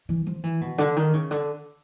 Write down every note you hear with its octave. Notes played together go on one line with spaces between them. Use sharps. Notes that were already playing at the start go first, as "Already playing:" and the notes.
E3
F3
E3
B2
D3
D#3
C#3
D3